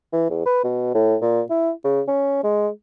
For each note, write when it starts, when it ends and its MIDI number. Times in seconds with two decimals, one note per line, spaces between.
0.13 0.25 52
0.30 0.42 40
0.46 0.64 71
0.64 0.92 47
0.94 1.16 45
1.21 1.42 46
1.50 1.71 64
1.84 2.01 49
2.08 2.42 61
2.43 2.68 56